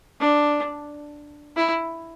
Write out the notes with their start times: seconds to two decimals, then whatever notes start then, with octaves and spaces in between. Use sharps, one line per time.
0.20 D4
1.56 E4